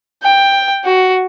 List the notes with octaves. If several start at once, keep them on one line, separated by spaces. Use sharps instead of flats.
G5
F#4